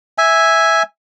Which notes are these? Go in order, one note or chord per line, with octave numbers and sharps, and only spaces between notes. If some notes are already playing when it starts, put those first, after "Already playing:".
E5 G#5